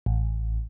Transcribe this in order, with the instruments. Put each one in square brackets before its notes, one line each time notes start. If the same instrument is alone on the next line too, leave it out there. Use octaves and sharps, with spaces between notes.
[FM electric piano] A1